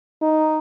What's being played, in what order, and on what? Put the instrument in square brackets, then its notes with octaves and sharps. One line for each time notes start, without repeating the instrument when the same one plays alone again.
[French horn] D#4